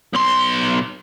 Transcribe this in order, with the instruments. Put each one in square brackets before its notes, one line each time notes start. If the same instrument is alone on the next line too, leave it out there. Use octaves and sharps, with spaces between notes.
[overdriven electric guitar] B1 C6